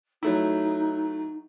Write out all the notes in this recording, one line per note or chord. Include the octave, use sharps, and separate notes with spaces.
F#3 A3 D#4 E4